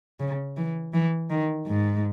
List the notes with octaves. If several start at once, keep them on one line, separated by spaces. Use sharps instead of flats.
C#3
E3
E3
D#3
G#2